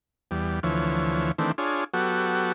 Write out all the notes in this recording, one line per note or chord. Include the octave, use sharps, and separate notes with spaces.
E2 G3
D2 E3 F3 C#5
D#3 E3 A3 C4 D4
D4 F4 G#4 C#5
F#3 B3 F#4 G4 A4